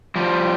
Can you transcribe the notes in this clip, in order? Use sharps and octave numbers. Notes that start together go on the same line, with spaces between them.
F3 G3